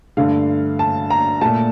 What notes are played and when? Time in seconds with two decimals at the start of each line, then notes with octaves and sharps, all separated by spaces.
0.17 G2 D3 A3 F5
0.79 A5
1.10 A#5
1.41 A#2 A3 A5